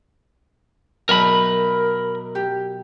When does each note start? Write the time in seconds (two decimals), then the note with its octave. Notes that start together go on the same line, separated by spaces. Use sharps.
1.09 F#2 B2 A#4 B5
2.35 G4